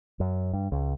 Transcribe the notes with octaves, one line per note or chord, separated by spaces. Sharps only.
F#2
G2
C#2